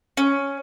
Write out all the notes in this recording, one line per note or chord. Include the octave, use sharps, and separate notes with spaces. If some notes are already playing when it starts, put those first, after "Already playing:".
C#4